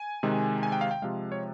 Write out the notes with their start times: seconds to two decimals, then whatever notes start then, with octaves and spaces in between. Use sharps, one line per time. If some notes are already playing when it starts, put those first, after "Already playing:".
Already playing: G#5
0.23 C3 D#3 G#3
0.63 G#5
0.72 G5
0.81 F5
0.91 G5
1.02 C3 F3 G#3 F5
1.32 C#5